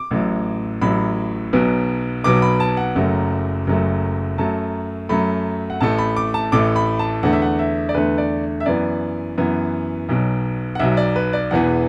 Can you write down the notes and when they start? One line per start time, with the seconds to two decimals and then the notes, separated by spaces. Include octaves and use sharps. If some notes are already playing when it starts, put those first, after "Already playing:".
Already playing: D6
0.11 A1 A2 F#3
0.81 A1 A2 F#3 B5
1.53 B1 B2 F#3 B3
2.24 B1 B2 F#3 B3 D6
2.42 B5
2.60 A5
2.77 F#5
2.95 F#1 F#2 F#3 A3
3.67 F#1 F#2 F#3 A3
4.38 F#2 F#3 A3 A5
5.09 F#2 F#3 A3 B5
5.70 F#5
5.81 A1 A2 A3 A5
5.98 B5
6.16 D6
6.34 A5
6.52 A1 A2 A3 D6
6.76 B5
6.99 A5
7.23 E2 D3 A3 F#5
7.33 E5
7.42 F#5
7.59 E5
7.89 D5
7.94 E2 D3 A3 B4
8.18 D5
8.60 E5
8.66 F#2 E3 B3 D5
9.37 F#2 E3 B3
10.09 B1 B2 F#3
10.75 F#5
10.79 B1 B2 F#3 E5
10.97 D5
11.16 B4
11.33 D5
11.51 E1 E2 E3 B3 F#5